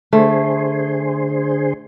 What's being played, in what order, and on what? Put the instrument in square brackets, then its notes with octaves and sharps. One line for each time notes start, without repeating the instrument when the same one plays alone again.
[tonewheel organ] D3 G#4 C5 [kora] A3